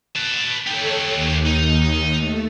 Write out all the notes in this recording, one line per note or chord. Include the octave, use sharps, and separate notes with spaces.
B4 A5
D#4 G4 A4 C#5
D#2
D#4
A3